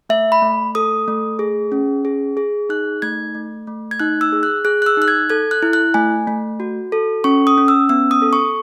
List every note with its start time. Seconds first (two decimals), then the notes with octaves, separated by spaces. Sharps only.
0.09 A3 E5
0.32 B5
0.42 A3
0.75 A4 D#6
1.08 A3
1.39 G#4
1.72 C#4
2.05 G#4
2.37 G#4
2.69 D#4 F#6
3.02 A3 G#6
3.35 A3
3.67 A3
3.91 G#6
4.00 D#4 F#6
4.21 E6
4.32 G#4
4.43 F#6
4.65 G#4 F#6
4.82 F#6
4.86 E6
4.97 D#4 F#6
5.08 G#6
5.30 A4 G#6
5.51 F#6
5.62 E4
5.73 F#6
5.94 A3 G#5
6.27 A3
6.60 F#4
6.92 A4
7.24 C#4 C#6
7.47 D#6
7.58 C#4
7.68 E6
7.89 B3 E6
8.11 D#6
8.22 A4
8.33 C#6